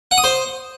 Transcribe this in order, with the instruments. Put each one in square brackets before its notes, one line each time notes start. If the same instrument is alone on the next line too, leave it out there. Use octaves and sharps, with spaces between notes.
[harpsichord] F#5
D#6
C5